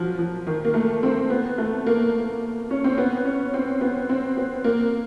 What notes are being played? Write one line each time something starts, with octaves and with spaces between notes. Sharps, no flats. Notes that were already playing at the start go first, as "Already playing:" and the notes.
Already playing: F3 F#3
F3
D#3
A#3
A3
C4
B3
A3
A#3
C#4
C4
B3
C#4
C4
B3
C4
B3
A#3